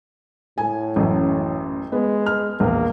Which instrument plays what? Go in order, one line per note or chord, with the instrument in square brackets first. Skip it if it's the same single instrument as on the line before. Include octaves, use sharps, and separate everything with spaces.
[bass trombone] A2 [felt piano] G#5
[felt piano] A1 F#2
[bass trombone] G#3 [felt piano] B3
[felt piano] F6
[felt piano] A#1 E2 [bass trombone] A#3